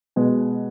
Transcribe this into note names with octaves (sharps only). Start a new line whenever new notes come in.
B2 G#3 B3